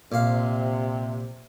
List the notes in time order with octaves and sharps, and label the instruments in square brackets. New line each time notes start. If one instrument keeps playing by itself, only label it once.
[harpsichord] A#1 F5 [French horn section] C3